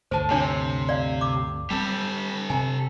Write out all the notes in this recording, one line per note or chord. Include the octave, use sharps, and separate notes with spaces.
D2 G2 D3 C5 A5
C3 D4 C#5 G#5
D5 F5
D6
G3 C4 G4 A4
C3 G#5 A#5